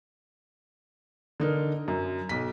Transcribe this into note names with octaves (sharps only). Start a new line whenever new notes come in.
D3 D#4 A#4
F#2
B1 B6